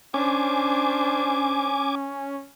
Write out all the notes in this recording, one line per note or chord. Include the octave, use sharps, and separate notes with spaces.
C#4 D4 C5 G#5 D6